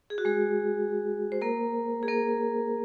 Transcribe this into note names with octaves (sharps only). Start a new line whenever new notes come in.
G#4
F#4
G#3 G#4
C5
A#3 A#4
G#4
A#3 A#4